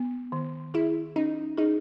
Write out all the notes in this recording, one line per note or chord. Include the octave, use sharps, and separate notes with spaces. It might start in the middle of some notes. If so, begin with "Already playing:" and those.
Already playing: B3
D#3
E4 G#4
C#4 D#4
D#4 G#4